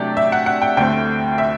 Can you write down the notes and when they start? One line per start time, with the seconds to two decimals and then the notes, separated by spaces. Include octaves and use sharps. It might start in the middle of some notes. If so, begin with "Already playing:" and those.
Already playing: C3 F#3 A3 D4 G4 D5
0.17 E5
0.32 F#5
0.46 F#5
0.62 G5
0.77 D2 D3 A3 C4 G5
1.38 E5